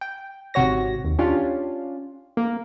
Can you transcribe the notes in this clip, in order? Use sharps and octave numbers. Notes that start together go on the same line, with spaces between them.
G5
G#1 C3 F#4 C#5 A#6
D#2
C#4 D4 F4 G4
A#3